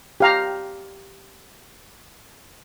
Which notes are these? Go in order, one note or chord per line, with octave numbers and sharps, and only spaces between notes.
G4 F5 A#5